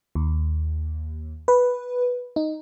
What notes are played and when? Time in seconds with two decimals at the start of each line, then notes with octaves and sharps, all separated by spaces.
0.15 D#2
1.48 B4
2.36 D#4